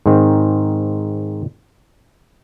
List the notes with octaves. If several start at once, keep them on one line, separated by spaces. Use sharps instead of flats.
G#2 D#3 C4